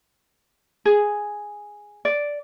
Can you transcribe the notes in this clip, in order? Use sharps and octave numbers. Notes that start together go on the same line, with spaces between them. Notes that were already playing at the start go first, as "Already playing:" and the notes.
G#4
D5